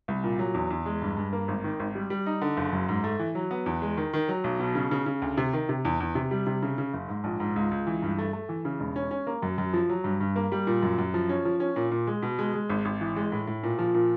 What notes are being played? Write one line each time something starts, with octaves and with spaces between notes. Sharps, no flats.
C2
A#2
F#3
E2
E2
G#3
G2
G2
A#3
G#1
D#3
G#1
G3
G3
D#4
D3
F#1
F#2
G#2
A3
E3
F#3
B3
E2
G#3
D#3
D#3
F#3
B1
B2
C#3
C#3
C#3
D2
C3
D#3
C3
E2
E2
C3
G3
C3
C#3
C#3
F#1
G#2
A#1
G#2
C#2
C#2
E3
G2
A3
A3
E3
C#3
E1
C#4
C#4
A#3
F#2
F#2
F3
F#3
G2
G2
A#3
G3
A#2
F#2
F#2
F3
C#4
F3
C#4
A#2
A#2
G#3
B2
G#3
G#3
G#1
G#1
E3
G#3
A2
A2
A#2
F3
A#2